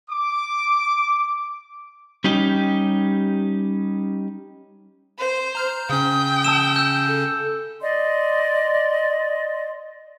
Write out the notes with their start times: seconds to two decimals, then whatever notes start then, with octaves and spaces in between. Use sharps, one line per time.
0.11 D6
2.24 G3 C#4 D#4 G4
5.18 C5
5.55 A#5 F6 G6
5.89 C#3 C#4 G5 D#6
6.44 A5 E6 E7
6.76 E6 G6
7.07 A4
7.82 D5 D#5 C6